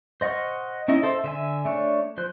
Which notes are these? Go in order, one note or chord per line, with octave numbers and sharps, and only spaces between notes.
C5 D#5 F#5 C#6 F6
C#4 D#4 E4 D#5
A4 C5 E5
D3 E5 G#5
A3 D4 C#5
F3 C5 F#6